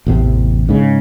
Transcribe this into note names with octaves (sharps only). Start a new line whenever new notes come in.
A1 E2 C3
G#2 C#3